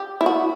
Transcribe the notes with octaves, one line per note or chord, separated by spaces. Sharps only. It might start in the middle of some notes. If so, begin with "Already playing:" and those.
Already playing: G4
E4
F#4